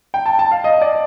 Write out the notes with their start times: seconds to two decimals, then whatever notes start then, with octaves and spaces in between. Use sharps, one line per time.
0.14 G5
0.26 A5
0.39 A5
0.51 F5
0.64 D#5
0.82 D5